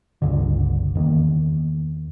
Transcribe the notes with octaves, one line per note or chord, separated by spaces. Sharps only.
G1 C#2 G2 D3
E2 D#3 A#3